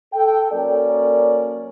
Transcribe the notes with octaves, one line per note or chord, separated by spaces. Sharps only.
A4 G5
F#3 A#3 C#4 A4 A#4 D5